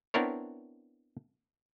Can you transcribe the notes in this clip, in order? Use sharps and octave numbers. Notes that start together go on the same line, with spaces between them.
B3 C4 D4 E4 A#4 C#5